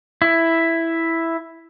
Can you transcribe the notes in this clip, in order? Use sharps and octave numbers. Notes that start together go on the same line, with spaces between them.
E4